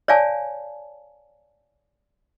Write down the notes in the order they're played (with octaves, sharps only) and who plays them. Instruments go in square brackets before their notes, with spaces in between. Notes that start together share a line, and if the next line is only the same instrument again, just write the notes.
[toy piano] C#5 D5 F5 G#5 A5